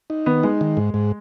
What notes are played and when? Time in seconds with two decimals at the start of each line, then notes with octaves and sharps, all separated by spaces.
0.10 D#4
0.26 D#3 B3
0.43 G#3 D#4
0.61 D#3
0.77 G#2
0.94 G#2